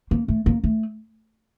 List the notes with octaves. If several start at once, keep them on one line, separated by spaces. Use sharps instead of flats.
A#3
A3
A#3
A3